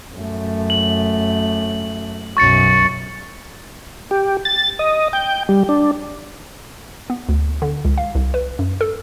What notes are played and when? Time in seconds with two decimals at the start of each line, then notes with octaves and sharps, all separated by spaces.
0.16 F#2 A3
0.70 F#7
2.37 B1 F#2 C#6 A6 C#7
4.11 G4
4.45 A6
4.79 D#5
5.13 G5
5.49 G3
5.69 D4
7.10 B3
7.29 D2
7.62 D3
7.85 C#2
7.98 F5
8.15 C2
8.34 B4
8.59 F#2
8.81 A4